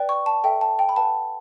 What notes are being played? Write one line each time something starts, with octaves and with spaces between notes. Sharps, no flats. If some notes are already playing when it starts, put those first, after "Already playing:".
Already playing: B4 D5 G5
C#6
A5
A4 E5 G5
A5
G5
B5
B4 F#5 A5